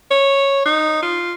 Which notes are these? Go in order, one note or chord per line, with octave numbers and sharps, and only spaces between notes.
C#5
D#4
F4